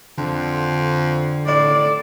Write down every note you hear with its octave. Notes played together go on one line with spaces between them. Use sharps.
F2 D3
A2 D5